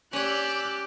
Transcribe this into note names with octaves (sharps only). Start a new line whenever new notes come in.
C#4 G4 C#5 D5 E6 F#6